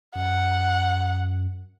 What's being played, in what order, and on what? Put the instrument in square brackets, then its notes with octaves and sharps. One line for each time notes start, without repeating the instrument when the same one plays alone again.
[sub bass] F#2 [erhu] F#5